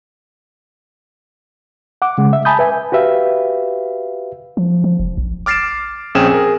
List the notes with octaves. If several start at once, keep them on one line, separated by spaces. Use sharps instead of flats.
F#5 D6
C#3 G#3
E5
G#5 A5 B5 D#6 G6
B4 E5 G#5
F#4 G4 B4 E5 F5
F3
F3
F1
A#1
D6 F6 A6 C7 D7 E7
A#1 C4 C#4 G#4 G5 E7
G#4 A#4